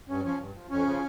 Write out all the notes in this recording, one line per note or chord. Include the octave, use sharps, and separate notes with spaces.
G2 C#4
F3 C#4
G2
F3
F2 C#4
C#3 F3